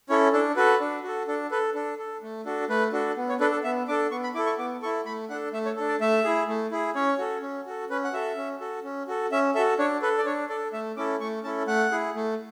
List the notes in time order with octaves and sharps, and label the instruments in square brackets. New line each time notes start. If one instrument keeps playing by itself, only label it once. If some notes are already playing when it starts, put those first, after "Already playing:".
[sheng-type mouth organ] C#4 E4 A4 C#5
D4 A4
F#4 A4 B4
D4
F#4 A4
D4 A4
A4 B4
D4 A4
A4
A3
D4 F#4 A4
A3 B4
D4 F#4 A4
B3
C#5
D4 A4 B4
A4
B3 E5
D4 A4 D6
B3 C#6
B5
E4 D6
A4
C#6
B3 D6
E4 A4 C#6
A3 B5
D4 A4 F#5
A3 E5
C#5
D4 A4
D5
A3 E5
E4 G#4
A3
E4 G#4
C#4 C#5
F#4 A4
C#4
F#4 A4
C#4 B4
F#5
F#4 A4 E5
C#4
F#4 A4
C#4
F#4 A4
C#4 E5
A4 E5
F#4
D4 C#5
A4 B4
D5
D4 C#5
A4 D5
A3 E5
C#4 E4 A4 D6
A3 C#6
C#4 E4 A4 A5
A3 F#5
E4 G#4
A3